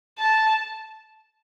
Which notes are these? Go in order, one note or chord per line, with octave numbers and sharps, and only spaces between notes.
A5